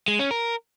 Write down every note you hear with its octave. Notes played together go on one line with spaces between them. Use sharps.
G#3
C#4
A#4